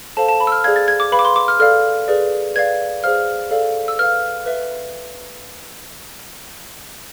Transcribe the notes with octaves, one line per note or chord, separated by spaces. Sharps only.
A4 C5 F5 A5
A5
B5
E6
F6
G#4 D5 F5 G#6
A6
G#6
D6
B4 F5 B5
D6
C6
D6
F6
A4 D5 F5 F6
G#4 B4 D5
B4 D5 F5 G#6
G#4 C5 F5 F6
A4 D5 F5
E6
B4 F5 F6
B4 E5